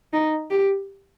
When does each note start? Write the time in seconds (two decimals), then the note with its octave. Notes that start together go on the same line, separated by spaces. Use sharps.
0.13 D#4
0.51 G4